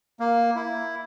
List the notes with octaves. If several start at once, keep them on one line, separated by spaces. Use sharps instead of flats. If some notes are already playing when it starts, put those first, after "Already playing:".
A#3
E4